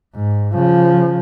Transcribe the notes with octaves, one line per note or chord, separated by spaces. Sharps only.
G#2
C#3 F3